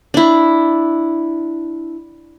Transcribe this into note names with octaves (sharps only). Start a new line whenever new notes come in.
D4 E4